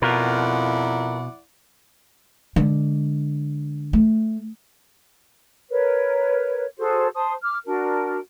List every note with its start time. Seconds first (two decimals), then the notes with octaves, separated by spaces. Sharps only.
0.02 F2 B2 E4 F4 A#4 D5 F#5
2.56 D3 G#3
3.93 A3
5.70 A#4 B4 C#5
6.78 F#4 G#4 A4 C5
7.14 C5 A5 C6 D#6
7.42 D6 F6
7.65 D4 F#4 A#4